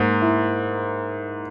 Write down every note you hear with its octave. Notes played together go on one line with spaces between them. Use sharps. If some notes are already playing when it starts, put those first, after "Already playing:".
Already playing: G#2 A#3
E4